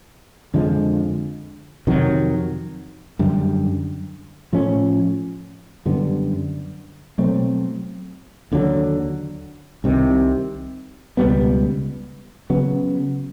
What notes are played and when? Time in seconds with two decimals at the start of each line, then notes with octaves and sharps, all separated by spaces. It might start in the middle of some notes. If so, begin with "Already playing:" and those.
0.54 F2 D3 F3 G#3
1.87 F2 C3 D#3 F#3
3.19 F#2 D3 G3
4.52 A2 F3 A3 C#4
5.86 F#2 D3 G3 B3
7.18 B2 F#3 A3 C4
8.52 D#2 D3 F#3
9.84 C2 C3 D#3
11.17 C#2 B2 G3 B3
12.50 C#3 F#3 B3